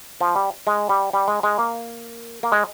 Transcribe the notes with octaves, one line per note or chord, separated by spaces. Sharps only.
F3
G3
G#3
G3
G3
G#3
G#3
A#3
A#3
G#3